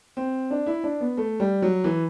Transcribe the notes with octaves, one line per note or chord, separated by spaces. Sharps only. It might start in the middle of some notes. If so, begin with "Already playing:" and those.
C4
D4
E4
D4
B3
A3
G3
F#3
E3